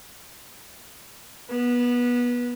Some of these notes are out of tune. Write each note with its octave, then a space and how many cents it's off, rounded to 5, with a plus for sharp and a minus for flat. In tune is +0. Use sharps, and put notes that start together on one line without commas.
B3 -20 B4 -20